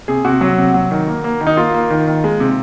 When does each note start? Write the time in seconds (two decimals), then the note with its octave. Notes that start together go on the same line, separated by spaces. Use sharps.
0.08 C3 G#4
0.25 C3 F#4
0.41 F#3
0.58 C3
0.74 F#3
0.91 D#3
1.07 A#3
1.24 A#3
1.41 D#3
1.47 D#4
1.57 A#3 F4
1.74 A#3
1.90 D#3
2.07 D#3
2.24 G#3
2.40 C3